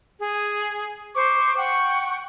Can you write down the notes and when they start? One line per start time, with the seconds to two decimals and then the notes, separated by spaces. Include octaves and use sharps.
0.21 G#4
1.15 C5 C#6 D6
1.57 F#5 G5 C#6